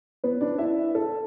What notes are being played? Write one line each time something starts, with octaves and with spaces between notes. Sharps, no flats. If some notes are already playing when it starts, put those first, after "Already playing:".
B3 B4
D4 D5
E4 E5
A4